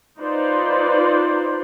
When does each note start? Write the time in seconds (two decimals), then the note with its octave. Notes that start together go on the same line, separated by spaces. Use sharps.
0.19 D#4 F4 B4 C5 D5